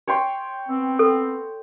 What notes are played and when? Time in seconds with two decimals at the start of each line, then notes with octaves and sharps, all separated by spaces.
0.07 C#5 G5 C6
0.69 B3 C4
0.99 A4